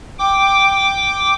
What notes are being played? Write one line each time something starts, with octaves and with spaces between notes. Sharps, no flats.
G5 D6